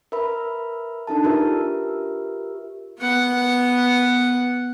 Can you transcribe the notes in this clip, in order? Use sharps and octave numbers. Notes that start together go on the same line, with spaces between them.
A#4 B4 E5 B5
D4 D#4 A4 A5
F4 G4 A#4 B4 E5
B3 F#5